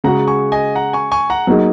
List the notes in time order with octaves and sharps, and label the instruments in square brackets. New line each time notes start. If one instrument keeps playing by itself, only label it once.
[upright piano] C#3 G#3 F#4 [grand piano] F#5 A#5
[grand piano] G#5 C#6
D#5 G#5
F#5 A#5
G#5 C#6
G#5 C#6
F#5 A#5
[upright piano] F#3 A#3 D#4 G#4